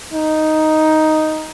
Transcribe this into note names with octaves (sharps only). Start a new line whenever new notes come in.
D#4